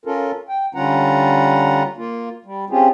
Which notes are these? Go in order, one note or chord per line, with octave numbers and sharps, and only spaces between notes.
C#4 F4 A4 A#4
G5
D3 G3 C#4 F4 F#5 A#5
A#3 F4
G3
C4 C#4 F4 G4 G#4